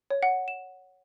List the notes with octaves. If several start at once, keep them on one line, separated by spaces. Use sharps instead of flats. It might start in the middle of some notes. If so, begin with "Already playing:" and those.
C#5
F#5
E7